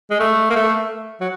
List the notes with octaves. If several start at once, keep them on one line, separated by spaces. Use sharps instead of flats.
G#3
A3
A#3
A3
F#3